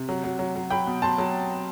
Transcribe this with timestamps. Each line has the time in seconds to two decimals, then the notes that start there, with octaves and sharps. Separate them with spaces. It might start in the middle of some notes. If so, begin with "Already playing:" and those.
Already playing: C3
0.09 F#3
0.24 F#3
0.39 F#3
0.56 F#3
0.70 F#3 G5 B5
0.87 B2
1.02 F#3 A5 C6
1.18 F#3